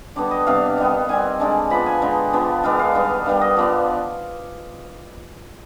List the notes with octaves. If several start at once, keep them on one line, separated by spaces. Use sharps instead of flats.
D3 G3 B3 D4 D5
D#5
C3 G3 B3 D4 F5
D#3 G3 B3
D#3 G3 C4 G#5
D3 G#3 D4
F3 B3 D4 B5
G#5
D3 G#3 B3 G5
F3 B3 D4
D#3 G#3 B3 D4 F5
F5
D#3 G3 B3 D4 D#5
D#3 G3 B3 D4 F5
D#5
F3 B3 D4 D5